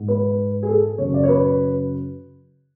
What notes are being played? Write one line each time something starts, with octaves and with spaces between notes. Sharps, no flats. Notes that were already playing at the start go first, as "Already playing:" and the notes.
Already playing: G#2
B4
G#4
A4
F#2 C#3 C#5
D5
C#5
B4